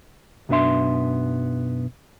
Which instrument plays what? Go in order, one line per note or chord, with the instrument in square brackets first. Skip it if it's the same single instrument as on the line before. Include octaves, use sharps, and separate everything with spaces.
[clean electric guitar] B1 F#2 B3 D4 E5 C6